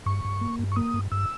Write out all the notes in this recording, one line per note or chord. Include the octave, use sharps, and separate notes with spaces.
G2 C#6
G2
A#3
G2
C#6
A#3 D#6
G2
G2 E6